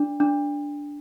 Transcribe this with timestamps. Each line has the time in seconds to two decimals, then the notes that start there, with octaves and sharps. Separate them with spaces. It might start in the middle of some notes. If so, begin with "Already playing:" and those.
Already playing: D4
0.20 D4